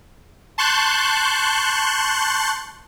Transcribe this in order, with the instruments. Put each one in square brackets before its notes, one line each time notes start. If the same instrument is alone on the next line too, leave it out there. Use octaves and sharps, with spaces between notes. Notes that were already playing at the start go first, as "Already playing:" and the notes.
[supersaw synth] A5 C6 C#6 F#6 G6